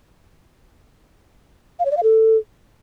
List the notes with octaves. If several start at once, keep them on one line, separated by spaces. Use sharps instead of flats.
F5
C#5
D5
F5
A4